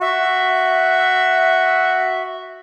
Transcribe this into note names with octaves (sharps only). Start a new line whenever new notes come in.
F#4 E5